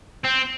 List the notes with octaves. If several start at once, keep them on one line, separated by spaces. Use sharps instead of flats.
C4